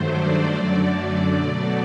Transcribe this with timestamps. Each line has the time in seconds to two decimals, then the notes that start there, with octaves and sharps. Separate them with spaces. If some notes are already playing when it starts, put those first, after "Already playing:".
Already playing: G2 D#3 F#3 A3 C5
0.10 D5
0.52 F#2 D3 F#3 A3
1.35 B2 F#3 A3